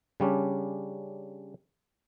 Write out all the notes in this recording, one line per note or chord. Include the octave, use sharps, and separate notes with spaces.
C#3 G3 C#4 D4